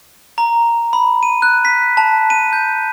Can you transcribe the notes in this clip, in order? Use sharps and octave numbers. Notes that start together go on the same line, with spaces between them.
A#5
B5
D#7
F#6
B6
A5
D#7
G6